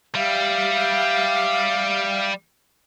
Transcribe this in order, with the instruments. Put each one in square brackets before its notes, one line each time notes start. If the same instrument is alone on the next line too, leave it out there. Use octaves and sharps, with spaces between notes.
[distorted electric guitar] G3 [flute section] E5 F5